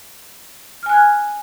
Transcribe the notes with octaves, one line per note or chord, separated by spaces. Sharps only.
G#5 F6 F#6 G#6